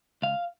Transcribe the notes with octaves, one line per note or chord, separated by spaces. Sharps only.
C#2 F5